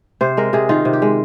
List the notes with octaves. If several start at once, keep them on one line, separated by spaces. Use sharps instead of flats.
C3 C5
G#3 A#4
C3 G#4
D#3 F4
C3
G4
G#3